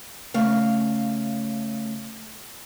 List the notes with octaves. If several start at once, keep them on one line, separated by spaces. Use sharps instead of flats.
C#3 A3 F5